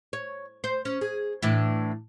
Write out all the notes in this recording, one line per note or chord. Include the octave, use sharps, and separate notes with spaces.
C#5
C5
C#4
G#4
A2 E3 D4